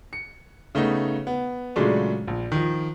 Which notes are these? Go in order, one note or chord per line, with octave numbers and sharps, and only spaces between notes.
C#7
C#3 A3 B3 D#4
B3
A#2 C#3 F#3 G#3 A3 D4
A#1
D#3 F3